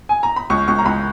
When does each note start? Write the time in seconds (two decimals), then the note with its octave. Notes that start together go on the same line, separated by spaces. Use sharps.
0.09 G#5
0.23 A#5
0.36 B5
0.50 C#2 C#6
0.68 C#2 C#6
0.78 A#5
0.85 C#2 B5